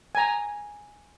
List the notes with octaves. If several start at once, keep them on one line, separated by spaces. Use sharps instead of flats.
G#5 A#5